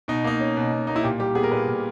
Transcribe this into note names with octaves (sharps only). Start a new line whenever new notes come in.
B2 D#4
A#3 D#4
C#4
B2
B2
A#3 D#4
E4
A#2 G4
G3 G4
B3 G#4
A#4
A#2 B4
A#2